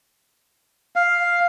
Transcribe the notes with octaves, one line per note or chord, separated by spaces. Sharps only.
F5